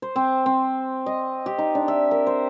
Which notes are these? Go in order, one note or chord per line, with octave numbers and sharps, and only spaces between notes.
C5
C4
C4
D#5
G4
D#4
D4
E5
A#4
C5